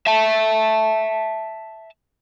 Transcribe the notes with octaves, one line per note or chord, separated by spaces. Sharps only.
E5 A5